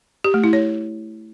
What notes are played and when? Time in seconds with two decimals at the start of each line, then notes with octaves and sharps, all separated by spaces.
0.24 G4
0.34 A3
0.44 E4
0.53 C#5